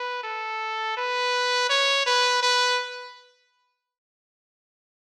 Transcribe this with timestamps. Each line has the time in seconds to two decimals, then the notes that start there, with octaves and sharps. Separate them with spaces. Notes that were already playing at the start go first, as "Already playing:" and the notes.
Already playing: B4
0.24 A4
0.97 B4
1.70 C#5
2.06 B4
2.43 B4